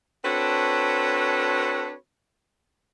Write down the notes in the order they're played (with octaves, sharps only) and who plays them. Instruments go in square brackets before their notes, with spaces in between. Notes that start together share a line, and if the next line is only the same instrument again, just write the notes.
[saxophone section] C4 D4 F#4 A4 B4 C#5